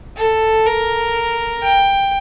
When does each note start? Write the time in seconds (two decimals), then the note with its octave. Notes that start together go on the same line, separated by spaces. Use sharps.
0.17 A4
0.66 A#4
1.63 G5